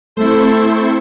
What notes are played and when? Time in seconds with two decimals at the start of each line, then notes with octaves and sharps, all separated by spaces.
0.17 A3 C4 E4 A4 C5 C#6